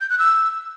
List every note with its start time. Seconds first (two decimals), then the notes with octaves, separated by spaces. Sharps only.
0.01 G6
0.10 F#6
0.19 E6